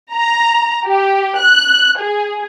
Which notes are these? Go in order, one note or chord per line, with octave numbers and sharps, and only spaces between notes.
A#5
G4
F#6
G#4